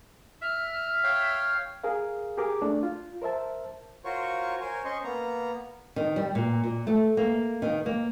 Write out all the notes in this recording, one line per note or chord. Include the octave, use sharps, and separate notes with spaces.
E5 F6
C#5 F5 G5
G#4 A#4 F5
G4 G#4 A#4 D6
A3 D4
F4
A#4 C5 E5 A5
F4 F#4 A#4 C5 C#5 C#6
A#4 C5 C#5 G#5
C#4 C5 D#5 C6 C#6
A#3 B3 A#5
D#3
G3
A#2
A#2
A3
A#3
D#3
A#3